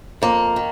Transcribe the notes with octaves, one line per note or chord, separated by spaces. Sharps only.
F2 A#3
D#3